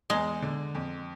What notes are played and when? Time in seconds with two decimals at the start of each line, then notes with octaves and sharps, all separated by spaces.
0.10 E2 G#3
0.42 D3
0.75 F2